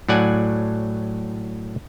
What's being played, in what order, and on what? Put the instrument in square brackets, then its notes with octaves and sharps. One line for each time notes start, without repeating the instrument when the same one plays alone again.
[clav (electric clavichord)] A2 F#3 D5 F#5 G#5